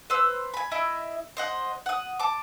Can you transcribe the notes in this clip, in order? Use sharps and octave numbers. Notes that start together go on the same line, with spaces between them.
B4 C5 E6
G#5 B5
E4 D#5 E5 B5
C5 D#5 F#5
F#5 D#6
A5 D6